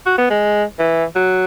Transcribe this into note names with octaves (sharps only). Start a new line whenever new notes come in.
F#4
B3
G#3
E3
F#3